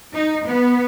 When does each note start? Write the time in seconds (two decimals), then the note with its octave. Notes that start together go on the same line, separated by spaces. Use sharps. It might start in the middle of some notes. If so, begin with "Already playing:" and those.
0.14 D#4
0.47 B3